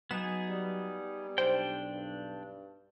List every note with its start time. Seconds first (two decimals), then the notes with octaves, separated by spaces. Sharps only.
0.11 F#3 B3 D#4 G#4 E7
0.49 G3
1.38 B1 D4 C5 G5
1.93 G2